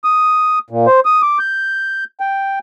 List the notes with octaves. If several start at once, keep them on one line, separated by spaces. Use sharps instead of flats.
D#6
A#2
C5
D#6
D6
G6
G5